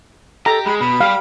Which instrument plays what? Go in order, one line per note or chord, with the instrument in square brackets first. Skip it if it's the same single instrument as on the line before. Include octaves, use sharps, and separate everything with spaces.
[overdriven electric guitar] G4 [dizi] A4 [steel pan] A#5
[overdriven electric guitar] G#3 [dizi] B5
[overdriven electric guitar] B2 [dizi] B5
[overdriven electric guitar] G3 G4 [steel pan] F5